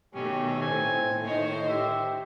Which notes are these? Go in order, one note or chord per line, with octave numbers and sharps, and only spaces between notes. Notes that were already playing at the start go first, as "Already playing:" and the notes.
B2 D#3 A3 C#4 G4
A2 C4 G#5
D#3 C5 C#5 D#5
G4 E5